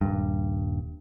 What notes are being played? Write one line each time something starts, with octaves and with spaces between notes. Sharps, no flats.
D#1 G2